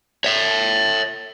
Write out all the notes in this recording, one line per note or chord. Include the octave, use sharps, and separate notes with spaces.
C#5 E5